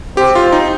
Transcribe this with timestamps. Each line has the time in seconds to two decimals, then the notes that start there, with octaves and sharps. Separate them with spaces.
0.17 C4 G4
0.35 F4
0.52 D#4